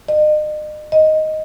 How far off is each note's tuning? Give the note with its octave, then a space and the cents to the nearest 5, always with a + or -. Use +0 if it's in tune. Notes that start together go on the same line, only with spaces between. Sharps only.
D#5 -40
D#5 +5